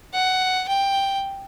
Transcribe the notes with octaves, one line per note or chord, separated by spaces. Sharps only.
F#5
G5